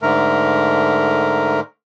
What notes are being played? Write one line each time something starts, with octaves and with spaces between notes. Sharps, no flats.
G#2 D3 A3 A#4